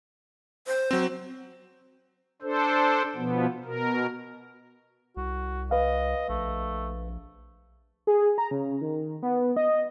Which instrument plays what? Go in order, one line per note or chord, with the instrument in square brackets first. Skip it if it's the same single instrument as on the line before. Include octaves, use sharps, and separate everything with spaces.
[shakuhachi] C5
[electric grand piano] F#3 C4
[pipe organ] D4 A4 C5
B2 F3 B3
B2 A#4
[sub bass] C2 [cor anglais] F#4
[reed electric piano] B4 F5 [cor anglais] D#5
[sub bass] A#1 [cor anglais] A3
[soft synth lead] G#4
A#5
C#3
D#3
B3
D#5